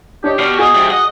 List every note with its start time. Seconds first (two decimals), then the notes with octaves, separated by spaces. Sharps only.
0.24 D4 G4 C#5 D#5
0.39 B2 D5 C#6 F6
0.59 F#4 G#4 D#5
0.75 G2 C3
0.90 D#5 F#5